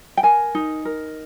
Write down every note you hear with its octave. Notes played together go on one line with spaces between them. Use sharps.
G5
A#4 G#5
D#4
A#4